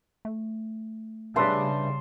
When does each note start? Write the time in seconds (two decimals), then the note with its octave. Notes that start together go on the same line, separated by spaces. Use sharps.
0.25 A3
1.36 C#3 G3 D4 B4 E5 A5 C6 D#6